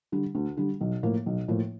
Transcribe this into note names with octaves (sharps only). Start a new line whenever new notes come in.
D3 G3
D2
D3 G3
B1
A2 F3 A#3
B1
A2 F3 A#3